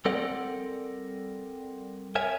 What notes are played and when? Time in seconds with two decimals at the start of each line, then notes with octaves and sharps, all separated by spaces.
0.05 G3 C4 A4 A#4 D5 F#5
2.15 A#4 C#5 E5 G#5